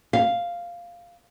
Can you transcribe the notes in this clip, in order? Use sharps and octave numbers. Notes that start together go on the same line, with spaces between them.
F5